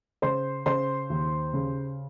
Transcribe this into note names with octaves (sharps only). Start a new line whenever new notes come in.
C#3 C5 C6
C#3 C5 C6
D#2
C#3